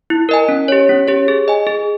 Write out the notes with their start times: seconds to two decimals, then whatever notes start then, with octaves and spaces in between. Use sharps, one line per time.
0.10 E4
0.29 A#4 D#5 G#5
0.49 C#4
0.68 G4 C#5
0.89 C#4
1.08 G4 C#5
1.28 G#4
1.48 D#5 G#5
1.67 G#4